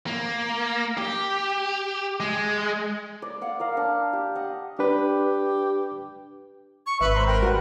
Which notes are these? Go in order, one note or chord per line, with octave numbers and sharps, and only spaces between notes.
A#3
G4
G#3
D5
F5 F#5
A#4 D#5 F5
D4
G4
D#5 F#5
D4 G4 B4
C#6
G#1 B4 E5
C5 A#5 C6
A#4 G5 B5
G3 F#4 B4 F#5